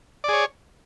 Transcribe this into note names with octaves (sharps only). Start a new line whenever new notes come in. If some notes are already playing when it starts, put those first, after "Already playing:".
G#4 C#5 D5